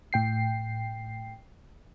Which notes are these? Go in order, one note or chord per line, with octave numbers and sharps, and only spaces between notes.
A2 G5 C7